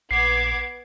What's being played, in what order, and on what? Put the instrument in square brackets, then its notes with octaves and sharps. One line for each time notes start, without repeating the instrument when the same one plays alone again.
[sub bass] A#1 [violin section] B3 D6 G#6 [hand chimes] C7